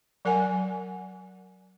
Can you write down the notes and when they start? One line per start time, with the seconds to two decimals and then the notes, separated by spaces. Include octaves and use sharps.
0.25 F#3 A#4 F#5 G#5